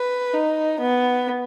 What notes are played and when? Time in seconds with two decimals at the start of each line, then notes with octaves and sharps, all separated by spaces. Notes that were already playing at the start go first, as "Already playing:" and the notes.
Already playing: B4
0.34 D#4
0.80 B3